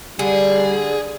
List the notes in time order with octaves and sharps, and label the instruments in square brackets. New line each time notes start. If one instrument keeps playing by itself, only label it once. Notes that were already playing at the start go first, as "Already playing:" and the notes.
[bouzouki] D3 [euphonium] G3 [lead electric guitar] G#4